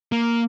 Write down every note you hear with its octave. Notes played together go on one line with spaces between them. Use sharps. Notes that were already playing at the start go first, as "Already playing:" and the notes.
A#3